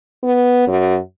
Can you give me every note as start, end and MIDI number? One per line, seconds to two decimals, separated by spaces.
0.24 0.67 59
0.68 0.97 42